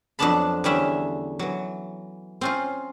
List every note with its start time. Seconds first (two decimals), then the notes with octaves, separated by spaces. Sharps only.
0.19 F2 F#3 B3 D4 A5 B5
0.64 E2 D3 G3 C#4 E5
1.39 E3 F#3
2.41 C4 C#4 F4